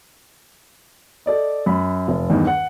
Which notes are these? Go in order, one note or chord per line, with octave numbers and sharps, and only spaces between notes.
A4 D5 D#5
F#2 B5
F1
E2 G2 D#3
F#5